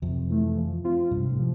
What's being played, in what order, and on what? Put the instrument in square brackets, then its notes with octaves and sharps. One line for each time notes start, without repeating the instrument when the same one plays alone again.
[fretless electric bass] F2 [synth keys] C3
[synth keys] E3 A3
F3
C4 F4
[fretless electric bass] G2 [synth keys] C3
[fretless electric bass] A2
[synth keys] F3